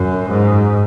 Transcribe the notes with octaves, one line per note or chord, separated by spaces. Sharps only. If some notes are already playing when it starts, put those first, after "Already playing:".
Already playing: F#2
G#2